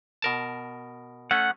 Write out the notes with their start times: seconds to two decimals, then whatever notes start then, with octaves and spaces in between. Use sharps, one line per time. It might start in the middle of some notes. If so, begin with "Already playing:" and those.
0.22 B2 A#4 A5
1.31 A3 C#4 F#5